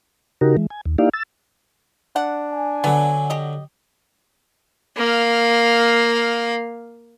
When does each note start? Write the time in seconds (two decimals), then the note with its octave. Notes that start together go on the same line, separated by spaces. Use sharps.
0.41 C#3 D#4 F#4 G4 A#4
0.57 E3 G#3
0.70 G#5
0.85 D#2
0.98 A#3 D#4 E4 G4 D5 F5
1.13 E6 A6
2.16 D4 F#5
2.53 G#5
2.84 D3 F#3 B3
3.30 G4 D#5
4.97 A#3 F5